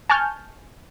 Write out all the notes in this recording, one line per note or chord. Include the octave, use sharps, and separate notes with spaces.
G#5 A5 C#6 F6 G6